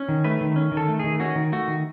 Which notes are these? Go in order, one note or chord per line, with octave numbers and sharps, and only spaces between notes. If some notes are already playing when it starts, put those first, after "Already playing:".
Already playing: C#4
D#3
A3 B4
D#3
C#4
D#3
A4
A3
D#3 G#4
C#4 F#4
D#3
A3 F#4
D#3